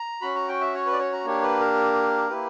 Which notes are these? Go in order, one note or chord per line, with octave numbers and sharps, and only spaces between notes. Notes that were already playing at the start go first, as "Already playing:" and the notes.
Already playing: A#5
C#4 F#4 B5
A#5
G5
E5
C#5
B4
D5
C#5
A#5
A#3 D4 G4 C#5
B4
A#4
A#3 E4 G4 B4